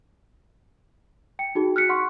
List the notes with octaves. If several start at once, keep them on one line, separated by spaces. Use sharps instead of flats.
G5 C#7
D#4 F#4 G#4
F6 F#6 B6 C#7
F#5 C6 C#6